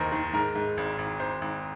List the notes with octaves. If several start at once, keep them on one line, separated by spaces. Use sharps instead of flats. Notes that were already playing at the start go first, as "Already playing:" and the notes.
Already playing: F1 D#2 D#3 A#4 C5
D#3
G#2 A#4
G#2
G#1
G#1
G#1 C5
G#1